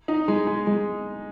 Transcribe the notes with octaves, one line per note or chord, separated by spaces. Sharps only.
D#4
G#3
G#3
G#3